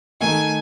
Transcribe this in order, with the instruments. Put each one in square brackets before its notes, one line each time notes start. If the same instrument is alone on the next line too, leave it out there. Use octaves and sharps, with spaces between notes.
[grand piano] D#3 A3 D#4 [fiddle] G#5